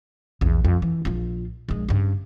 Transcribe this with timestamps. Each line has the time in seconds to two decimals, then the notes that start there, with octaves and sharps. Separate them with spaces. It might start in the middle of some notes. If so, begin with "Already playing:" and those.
0.41 A#1 E2
0.65 F2
0.82 E3
1.05 A#1 F4
1.69 A#1 G#3
1.89 G2 C#3